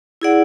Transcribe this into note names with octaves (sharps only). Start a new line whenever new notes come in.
E4 G#4 D5 F#5